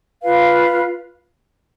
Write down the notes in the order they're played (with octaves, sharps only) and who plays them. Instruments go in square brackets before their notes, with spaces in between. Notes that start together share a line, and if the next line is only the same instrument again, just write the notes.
[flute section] F4 B4 F5